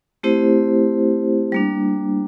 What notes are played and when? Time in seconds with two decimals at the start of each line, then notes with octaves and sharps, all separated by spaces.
0.23 A3 C4 E4 G4 C5
1.52 G3 A#3 D4